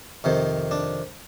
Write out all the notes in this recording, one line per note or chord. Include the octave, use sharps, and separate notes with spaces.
F2 C3 D#3
D4